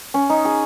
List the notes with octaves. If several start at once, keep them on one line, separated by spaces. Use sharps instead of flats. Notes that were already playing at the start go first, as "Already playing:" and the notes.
C#4
D#4
G#4